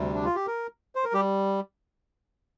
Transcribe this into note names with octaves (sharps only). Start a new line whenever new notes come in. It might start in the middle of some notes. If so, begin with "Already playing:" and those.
Already playing: D2 C3 G3
D4
F4
G4
A#4
C5
A#4
G3 G4